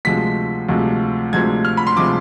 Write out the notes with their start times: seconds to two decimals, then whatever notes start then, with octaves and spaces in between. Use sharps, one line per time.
0.05 D2 C3 F3 G#3 B6
0.69 D2 C3 F3 G#3
1.33 D2 C3 F3 G#3 G#6
1.65 F6
1.77 B5
1.87 C6
1.97 C3 F3 G#3 D6